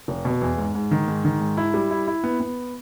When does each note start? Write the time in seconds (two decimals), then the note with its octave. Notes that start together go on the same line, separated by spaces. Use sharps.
0.08 F1
0.25 B2
0.41 E2
0.58 G#2
0.75 G#2
0.91 D#3
1.08 G#2
1.25 D#3
1.41 G#2
1.57 E4
1.74 G3
1.91 E4
2.07 E4
2.24 B3
2.40 B3